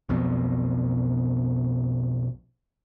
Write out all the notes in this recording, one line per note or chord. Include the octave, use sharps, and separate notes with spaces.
B1 F2 B2